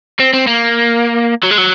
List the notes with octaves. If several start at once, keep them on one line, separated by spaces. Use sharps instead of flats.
C4
C4
A#3
F#3
G#3
F#3